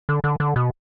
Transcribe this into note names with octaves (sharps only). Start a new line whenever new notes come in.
D3
D3
D3
B2